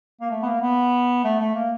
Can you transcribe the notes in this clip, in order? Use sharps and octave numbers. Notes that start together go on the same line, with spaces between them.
A#3
A3
B3
A#3
B3
A3
A3
A#3